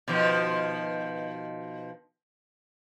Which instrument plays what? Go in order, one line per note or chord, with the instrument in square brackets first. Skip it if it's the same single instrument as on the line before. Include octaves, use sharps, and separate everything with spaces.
[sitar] B2 D#3 F3